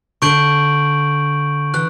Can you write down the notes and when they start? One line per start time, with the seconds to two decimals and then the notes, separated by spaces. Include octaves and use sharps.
0.22 D3 C#6 G6 D7 F#7
1.74 E3 F#6